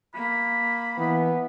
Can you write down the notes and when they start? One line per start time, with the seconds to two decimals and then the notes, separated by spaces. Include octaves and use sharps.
0.15 A#3 B5
0.98 E3 B3